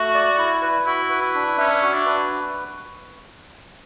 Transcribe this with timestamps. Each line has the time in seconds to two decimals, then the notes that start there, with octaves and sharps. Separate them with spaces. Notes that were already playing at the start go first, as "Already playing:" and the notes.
Already playing: A3 F#4
0.14 D5
0.38 E4
0.62 B4
0.86 E4 F#4
1.10 B4
1.21 E4
1.35 D4
1.58 C#4 E5
1.82 F#4
1.94 D4
2.06 B4